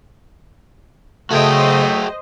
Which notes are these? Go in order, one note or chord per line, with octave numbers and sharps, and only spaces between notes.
C#3 F#3 A3 F#4 G#4 C5 D#5 G5